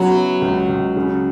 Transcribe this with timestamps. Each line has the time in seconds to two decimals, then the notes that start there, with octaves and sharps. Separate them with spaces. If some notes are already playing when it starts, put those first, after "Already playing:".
Already playing: C#3 F#3 B3
0.14 E4
0.41 C#2
0.68 C#2
0.96 C#3